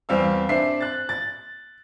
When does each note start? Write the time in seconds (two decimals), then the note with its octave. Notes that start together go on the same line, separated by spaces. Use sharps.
0.09 E2 G3 C4 F5 E6
0.49 C4 D4 C5 E5 C7
0.81 F#6 A6
1.09 A6